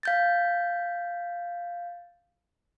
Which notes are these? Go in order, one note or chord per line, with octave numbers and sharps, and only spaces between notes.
F5 G6 A6